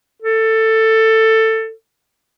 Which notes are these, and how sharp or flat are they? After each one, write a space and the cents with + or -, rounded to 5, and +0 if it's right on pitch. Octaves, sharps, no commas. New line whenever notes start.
A4 +15